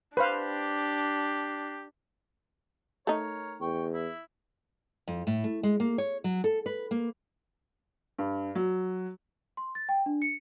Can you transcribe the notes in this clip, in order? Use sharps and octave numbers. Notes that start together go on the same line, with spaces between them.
D4 G4 B4 C5 F5
A3 D#4 A#4 C#5
E2 G5 C#6
E4
F2
A2
A3
G#3
A#3
C#5
F#3
A4
B4
A#3
G2
F#3
C6
A6
G5
D4
C#7